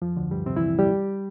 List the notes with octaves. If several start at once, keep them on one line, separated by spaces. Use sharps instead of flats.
F2 F3
D2 D3
G2 G3
C3 C4
E3 E4
G3 G4